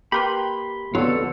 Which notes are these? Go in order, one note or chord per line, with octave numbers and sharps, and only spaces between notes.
A#3 G4 A#4 B4 B5 C6
F2 D3 F#3 B3 F4 A4